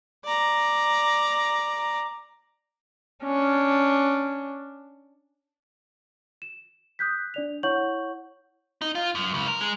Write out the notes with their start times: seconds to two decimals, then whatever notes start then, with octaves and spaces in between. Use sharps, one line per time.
0.25 D5 A#5
3.24 C#4 D4
6.42 E7
6.99 D#6 F#6 G6 B6
7.34 D4 D5 F7
7.63 E4 C#5 F#5 C#6 G6 F#7
8.82 D#4
8.95 F4
9.15 F#2
9.34 C#2
9.48 A#4
9.61 G#3